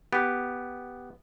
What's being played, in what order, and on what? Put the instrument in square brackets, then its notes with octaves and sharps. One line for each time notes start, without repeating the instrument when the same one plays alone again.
[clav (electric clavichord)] B3 G4